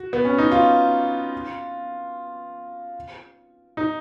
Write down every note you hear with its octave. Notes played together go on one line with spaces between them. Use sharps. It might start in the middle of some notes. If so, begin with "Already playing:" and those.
Already playing: F#4
B3
C#4
D#4
F4
D#4